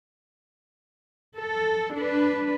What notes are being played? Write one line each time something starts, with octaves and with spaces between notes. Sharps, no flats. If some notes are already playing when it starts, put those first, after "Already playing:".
A4
D4 B4